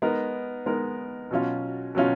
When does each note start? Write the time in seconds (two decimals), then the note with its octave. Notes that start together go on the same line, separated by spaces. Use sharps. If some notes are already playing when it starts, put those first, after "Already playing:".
0.02 G#3 B3 D#4 A#4
0.66 G#3 B3 D#4 A#4
1.31 B2 F#3 C#4 F4
1.95 B2 F#3 C#4 F4